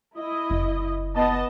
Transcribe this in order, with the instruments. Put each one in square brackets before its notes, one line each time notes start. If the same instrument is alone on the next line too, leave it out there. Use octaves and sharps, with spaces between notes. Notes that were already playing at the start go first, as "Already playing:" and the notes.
[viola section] E4 D#5
[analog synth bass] F#1
[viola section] B3 D#5 A5